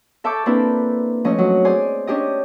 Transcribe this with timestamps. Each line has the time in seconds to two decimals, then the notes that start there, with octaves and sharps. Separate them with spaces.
0.24 A4 E5 A5 C#6 D6 G6
0.46 A#3 C4 D4 E4 A4 B4
1.25 F3 A3 C#4 D#5
1.38 F#3
1.65 G#4 C5 D5 G#5
2.07 C#4 D4 G4 D#5